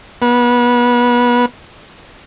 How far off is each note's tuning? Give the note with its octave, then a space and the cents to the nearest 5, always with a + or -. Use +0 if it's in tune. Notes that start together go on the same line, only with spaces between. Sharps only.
B3 -30